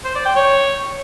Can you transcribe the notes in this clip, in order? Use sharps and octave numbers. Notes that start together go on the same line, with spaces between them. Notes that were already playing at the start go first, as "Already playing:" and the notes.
C5
D5
G5
C#5